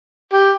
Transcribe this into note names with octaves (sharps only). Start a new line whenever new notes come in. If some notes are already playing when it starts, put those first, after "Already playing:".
G4